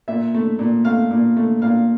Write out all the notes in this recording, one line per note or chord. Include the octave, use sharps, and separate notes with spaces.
A#2 E5
A3
A#2
A3 F5
A#2
A3
A#2 F5